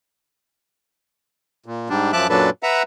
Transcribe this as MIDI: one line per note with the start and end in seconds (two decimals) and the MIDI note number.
1.66 1.89 46
1.90 2.12 44
1.90 2.12 55
1.90 2.12 62
2.13 2.27 42
2.13 2.27 53
2.13 2.27 76
2.13 2.27 81
2.13 2.27 86
2.13 2.27 90
2.29 2.50 42
2.29 2.50 46
2.29 2.50 54
2.29 2.50 62
2.29 2.50 69
2.29 2.50 71
2.63 2.83 71
2.63 2.83 76
2.63 2.83 78
2.63 2.83 82